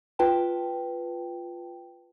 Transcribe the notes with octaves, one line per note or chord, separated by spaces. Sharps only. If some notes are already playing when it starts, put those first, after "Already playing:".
F4 B4 G5 A5